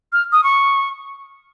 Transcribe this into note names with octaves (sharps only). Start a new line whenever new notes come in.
F6
D#6
C#6